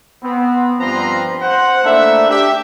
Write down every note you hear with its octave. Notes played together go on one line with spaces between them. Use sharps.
B3 C4
G2 F3 C4 B4 A#5 C6
C5 F#5
A3 A#3 D4 E4 E5
D4 G4 E5